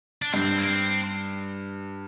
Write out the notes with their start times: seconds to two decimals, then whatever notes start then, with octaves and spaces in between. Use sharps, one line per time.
0.22 D4
0.34 G2 C4
0.58 A#3
0.66 C4